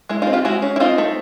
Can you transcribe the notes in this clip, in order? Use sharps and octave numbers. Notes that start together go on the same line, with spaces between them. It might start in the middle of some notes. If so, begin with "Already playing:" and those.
G#3 E4
D#4 F4
C4
F4 G4
G#3 E4 F#4
C#4
E4
C4 D#4 F4
A3